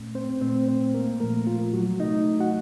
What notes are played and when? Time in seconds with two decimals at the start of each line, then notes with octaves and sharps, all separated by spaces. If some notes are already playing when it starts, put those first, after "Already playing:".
Already playing: A#2 A3 C#4
0.15 C4 C5
0.41 A#2 A3 C4 C5
0.68 C4 C5
0.94 A#3 A#4
1.20 A#2 F3 A3 A#3 A#4
1.47 F4
1.73 F#3 F#4
2.00 C3 F#3 A3 D#4 D#5
2.40 F#4 F#5